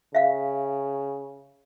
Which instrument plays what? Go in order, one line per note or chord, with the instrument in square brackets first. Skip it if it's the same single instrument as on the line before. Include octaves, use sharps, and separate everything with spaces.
[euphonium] C#3 [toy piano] E5 F5